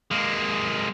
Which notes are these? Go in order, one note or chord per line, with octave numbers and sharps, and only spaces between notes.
G#3 A#3